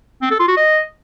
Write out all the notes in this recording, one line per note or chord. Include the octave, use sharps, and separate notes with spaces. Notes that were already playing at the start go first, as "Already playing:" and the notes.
C4
A4
F4
F#4
D#5